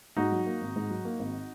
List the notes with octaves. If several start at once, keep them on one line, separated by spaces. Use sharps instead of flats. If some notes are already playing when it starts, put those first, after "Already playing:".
G#2 D#4 F#4
F#3
A#3
G#1
G#2
F#3
A#3
G#1